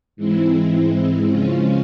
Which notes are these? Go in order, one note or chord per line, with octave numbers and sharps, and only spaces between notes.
G#2 E3 G#3 C4 E4
C#3 F3 G#3 C#4 F4